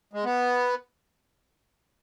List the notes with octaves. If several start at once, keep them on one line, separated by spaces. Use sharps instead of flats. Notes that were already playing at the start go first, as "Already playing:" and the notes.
G#3
B3